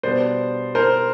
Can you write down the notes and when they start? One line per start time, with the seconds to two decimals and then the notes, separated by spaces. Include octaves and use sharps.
0.03 B2 G3 B3 D4 C5 D5
0.75 A#4 C5